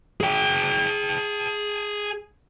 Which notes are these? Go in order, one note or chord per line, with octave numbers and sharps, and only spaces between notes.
G#4 G5